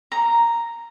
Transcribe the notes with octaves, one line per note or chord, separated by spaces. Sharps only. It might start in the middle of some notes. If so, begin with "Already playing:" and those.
A#5